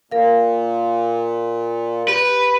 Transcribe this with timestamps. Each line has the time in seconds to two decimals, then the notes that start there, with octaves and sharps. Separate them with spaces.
0.11 A#2 A#4 F5
2.08 G4 B4